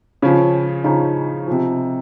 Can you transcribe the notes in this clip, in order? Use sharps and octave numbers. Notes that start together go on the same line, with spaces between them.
C#3 F3 C#4
C#3 F3 D#4
C3 F3